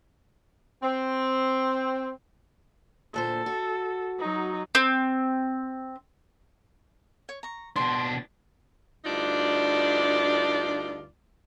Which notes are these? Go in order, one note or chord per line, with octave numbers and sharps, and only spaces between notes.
C4
D2 A#2 A4 C5
F#4
F#3 D#4
C4
C#5
A#5 C#6
B2 D4 C6
D2 G2 D4 D#4 F4 D5